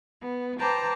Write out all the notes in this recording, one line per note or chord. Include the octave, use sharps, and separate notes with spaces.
B3
B4 C5 G5 A5 A#5 D6